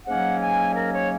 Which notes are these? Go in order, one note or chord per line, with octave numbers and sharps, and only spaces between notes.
G#2 F#3 A#3 C#4 F#5
G#5
A#4
C#5